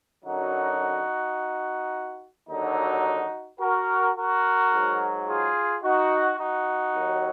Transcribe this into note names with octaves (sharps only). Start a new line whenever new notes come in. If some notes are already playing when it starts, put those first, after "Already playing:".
F#2 D3 F#3 D#4 F#4
D#2 D3 F#3 D#4 F#4
F#4 A#4
F#4 A#4
G#2 F#3
F4 G#4
D#4 F#4
D#4 F#4
D#2 D#3 F#3